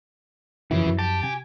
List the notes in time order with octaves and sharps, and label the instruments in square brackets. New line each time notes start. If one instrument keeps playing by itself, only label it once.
[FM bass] F#2 [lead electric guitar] C#3 [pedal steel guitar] E3 [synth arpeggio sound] F3 E4
[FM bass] F#2
[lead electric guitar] G4 [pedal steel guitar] A5
[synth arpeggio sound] C3 [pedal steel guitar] G#5